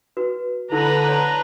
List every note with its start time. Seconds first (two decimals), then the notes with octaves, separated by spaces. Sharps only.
0.17 F#4 B4
0.72 D3 D4 E4 B4 A#5
1.09 C#5 B5 C6